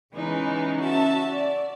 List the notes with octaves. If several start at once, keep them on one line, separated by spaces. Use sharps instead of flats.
C#3 E3 G#3 B3 C#4 D#4
C#4 F#4 E5 A5
D5